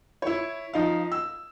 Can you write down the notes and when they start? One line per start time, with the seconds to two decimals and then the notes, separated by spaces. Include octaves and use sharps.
0.22 E4 C#5
0.73 F3 D#4 F5
1.12 E6